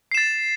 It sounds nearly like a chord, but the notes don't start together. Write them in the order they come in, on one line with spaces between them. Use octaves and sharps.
C7 E7 A6